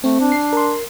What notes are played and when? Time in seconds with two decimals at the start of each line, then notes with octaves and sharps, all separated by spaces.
0.04 A3 C4
0.21 D4
0.32 C7
0.53 A#4 C6